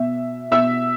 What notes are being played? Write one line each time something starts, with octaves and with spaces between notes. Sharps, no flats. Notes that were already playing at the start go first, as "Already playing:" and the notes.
Already playing: B2 E5
B2 E5 E6